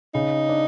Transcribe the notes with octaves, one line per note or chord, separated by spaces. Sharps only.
C#3 D#4
D4